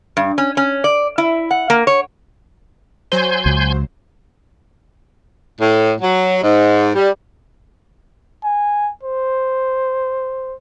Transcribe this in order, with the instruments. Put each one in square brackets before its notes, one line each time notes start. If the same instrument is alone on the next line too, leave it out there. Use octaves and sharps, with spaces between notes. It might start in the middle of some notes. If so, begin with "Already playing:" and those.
[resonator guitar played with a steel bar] G2
C#4
C#4
D5
E4
F#5
A#3
C#5
[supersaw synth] F#3 C5 [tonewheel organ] G#5 C6 G6
[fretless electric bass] C#2
[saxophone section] A2
F#3
G#2
G3
[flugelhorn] G#5
C5